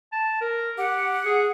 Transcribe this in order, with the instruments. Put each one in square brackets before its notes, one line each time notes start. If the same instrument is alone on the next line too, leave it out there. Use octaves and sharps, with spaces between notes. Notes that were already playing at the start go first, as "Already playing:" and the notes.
[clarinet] A5
A#4
[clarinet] G4 [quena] F#5
[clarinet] G#4